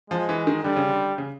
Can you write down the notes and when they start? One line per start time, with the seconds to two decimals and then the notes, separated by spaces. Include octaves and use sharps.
0.10 F3 G#3
0.29 E3
0.47 D#3
0.64 D3 G3
0.76 C#3
0.89 D3
1.18 C#3